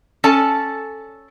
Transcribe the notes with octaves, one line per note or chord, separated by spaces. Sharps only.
C#4 A4 D5 A5